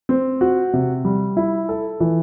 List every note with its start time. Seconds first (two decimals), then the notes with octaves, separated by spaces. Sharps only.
0.09 C4
0.41 F#4
0.73 C3
1.05 G3
1.37 E4
1.69 A4
2.00 E3